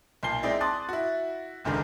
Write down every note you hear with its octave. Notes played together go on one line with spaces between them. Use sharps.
B1 A#2 A5 C7 G7
G#3 C4 D#4 E4 D5
A5 C6 D6 D#6 F#6 A6
E4 F#4
F#1 C#2 F#2 D3 D#3